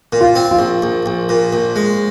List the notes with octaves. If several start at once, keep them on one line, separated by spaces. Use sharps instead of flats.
A#2
F4
C4
F4
A#1
A#1
A#1
A#2
A#1
G#3